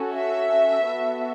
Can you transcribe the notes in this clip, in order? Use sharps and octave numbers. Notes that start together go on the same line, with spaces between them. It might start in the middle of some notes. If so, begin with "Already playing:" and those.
Already playing: C#4 F#4 A4
E5
B3 F#4 A4